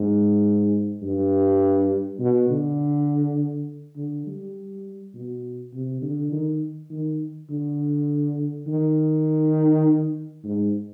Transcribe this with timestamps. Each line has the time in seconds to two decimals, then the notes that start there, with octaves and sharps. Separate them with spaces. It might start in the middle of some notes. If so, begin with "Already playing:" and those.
Already playing: G#2
1.03 G2
2.19 B2
2.50 D3
3.97 D3
4.26 G3
5.14 B2
5.74 C3
6.02 D3
6.32 D#3
6.91 D#3
7.50 D3
8.67 D#3
10.44 G#2